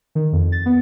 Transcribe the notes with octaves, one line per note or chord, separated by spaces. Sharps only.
D#3
F2
A6
B3